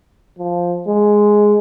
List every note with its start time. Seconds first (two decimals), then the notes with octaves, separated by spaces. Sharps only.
0.39 F3
0.88 G#3